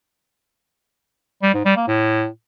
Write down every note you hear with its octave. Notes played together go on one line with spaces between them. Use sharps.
G3
G#2
G3
A#3
A2